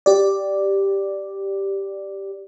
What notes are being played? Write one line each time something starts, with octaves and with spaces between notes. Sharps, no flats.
G4 D5